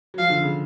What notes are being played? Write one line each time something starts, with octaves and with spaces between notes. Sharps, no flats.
F#3
F3 F5
D3
C#3